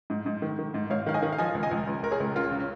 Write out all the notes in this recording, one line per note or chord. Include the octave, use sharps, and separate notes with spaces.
G#2
G#2
D#3
D#3
G#2
G#2 C#5 F5
D#3 F5
D#5 G#5
D#3
F5
F3 D#5 G#5
C#2
D#5 G#5
C#2
C#2
C#2 A#4
G#4 C#5
C#2
C#3 F4 A#4
C#3
C#4